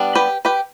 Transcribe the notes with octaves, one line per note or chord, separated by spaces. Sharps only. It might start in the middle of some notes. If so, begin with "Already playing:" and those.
Already playing: G3 B3 D4
G4 B4
G4 B4